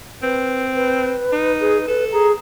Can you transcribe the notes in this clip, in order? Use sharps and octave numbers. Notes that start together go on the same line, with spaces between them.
C4 B4
B4
D#4
G#4
A4 B4
G#4 A#5